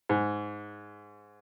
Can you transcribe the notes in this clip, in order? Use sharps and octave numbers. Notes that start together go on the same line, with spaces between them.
G#2